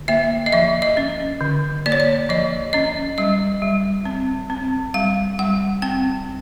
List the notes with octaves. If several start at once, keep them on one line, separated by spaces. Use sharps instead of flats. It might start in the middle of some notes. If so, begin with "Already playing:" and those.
Already playing: D3
A#3 E5
D#5
F3 E5
D#5
C#4
D3
A#3 D5
C#5
D5
F3 D#5
C#4 D#5
G3 D#5
G3
C4
C4
G3 F5
G3 F#5
C4 G5